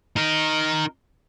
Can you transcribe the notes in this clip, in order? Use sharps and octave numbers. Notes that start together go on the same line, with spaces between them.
D#4 A#4